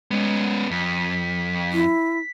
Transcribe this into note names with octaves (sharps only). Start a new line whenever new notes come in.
G#3 B3 C#4
F2 B6
E4